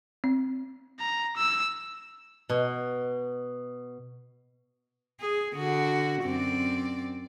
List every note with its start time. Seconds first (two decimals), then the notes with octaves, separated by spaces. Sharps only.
0.24 C4
1.00 A#5
1.37 E6
2.49 B2
5.20 G#4
5.55 D3 F#4
6.22 F#2 C4 D5